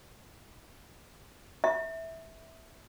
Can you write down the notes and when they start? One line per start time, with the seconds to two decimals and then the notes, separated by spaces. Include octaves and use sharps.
1.64 E5